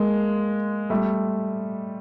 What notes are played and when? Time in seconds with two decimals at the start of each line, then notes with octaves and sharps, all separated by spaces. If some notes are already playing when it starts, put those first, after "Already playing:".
Already playing: G#3 A#3
0.90 G3 A3